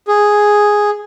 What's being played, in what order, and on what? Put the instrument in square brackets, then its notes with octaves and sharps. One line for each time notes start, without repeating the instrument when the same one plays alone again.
[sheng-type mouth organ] G#4